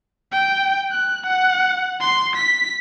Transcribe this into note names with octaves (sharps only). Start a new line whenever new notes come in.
G5
F#6
F#5
C6
B6